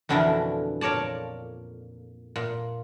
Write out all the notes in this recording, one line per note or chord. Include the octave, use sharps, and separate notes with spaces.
F2 B2 D3 E3 E4 A#4
A#2 A#4 C#5 D5 A5
A#2